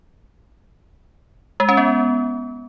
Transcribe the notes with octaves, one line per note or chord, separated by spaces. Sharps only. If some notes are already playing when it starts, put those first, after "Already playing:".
G#3
C#4
B3